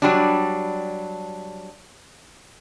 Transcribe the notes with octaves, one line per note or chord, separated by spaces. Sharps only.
F#3 G3 D4